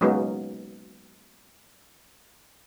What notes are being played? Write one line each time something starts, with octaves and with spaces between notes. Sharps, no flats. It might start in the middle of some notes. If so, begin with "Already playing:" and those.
F#3 G#3 A#3 B3 C#4 D#4